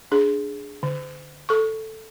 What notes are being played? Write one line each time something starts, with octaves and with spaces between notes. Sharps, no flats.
D4 G#4
D3
A4 C#6